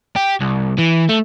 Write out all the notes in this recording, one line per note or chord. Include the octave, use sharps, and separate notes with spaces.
G4
C2
E3
A3